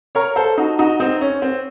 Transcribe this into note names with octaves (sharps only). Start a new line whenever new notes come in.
A#4 C#5
A4 C5
D#4 F#4
D#4 F#4
C4 D#4
C#4
C4